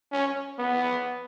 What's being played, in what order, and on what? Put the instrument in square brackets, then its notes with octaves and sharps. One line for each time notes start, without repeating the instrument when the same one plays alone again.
[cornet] C#4
B3